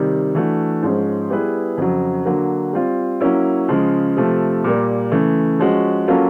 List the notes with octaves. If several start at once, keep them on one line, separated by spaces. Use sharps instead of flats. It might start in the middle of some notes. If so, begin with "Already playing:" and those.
Already playing: C3 D#3 G3
E3 A3 D4 F#4
G#2 F3 G#3 C#4
G3 B3 E4 G#4 B4
F2 C#3 F#3
D3 F#3 A#3
G3 C4 F4
F#3 A#3 C#4 E4
C#3 F3 G#3
C3 F3 A3
A#2 G3 A#3
C#3 E3 A3
F3 G#3 C#4 F#4
F#3 A#3 C#4 F4 A4